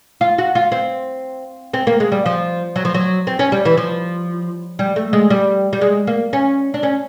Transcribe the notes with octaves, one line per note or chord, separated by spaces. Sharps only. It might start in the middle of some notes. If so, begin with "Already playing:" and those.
F4
F#4
F4
C4
C4
A#3
G#3
G3
F3
F#3
F3
F#3
C4
C#4
G3
E3
F3
G3
A3
G#3
G3
G3
G#3
A#3
C#4
D4
C#4